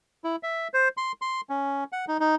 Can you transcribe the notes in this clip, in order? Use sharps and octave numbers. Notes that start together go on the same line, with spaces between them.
E4
E5
C5
C6
C6
C#4
F#5
D#4
D#4